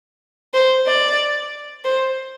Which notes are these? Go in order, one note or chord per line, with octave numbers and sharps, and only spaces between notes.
C5
D5
C5